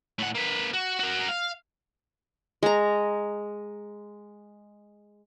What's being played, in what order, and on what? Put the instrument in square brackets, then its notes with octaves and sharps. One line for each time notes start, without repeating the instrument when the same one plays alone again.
[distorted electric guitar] A2 F#5
A#3 B4
F#4
F#4 A#4
F5
[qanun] G#3 A#5